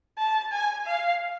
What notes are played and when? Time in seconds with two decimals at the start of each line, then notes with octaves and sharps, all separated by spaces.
0.18 A5
0.52 G#5
0.86 F5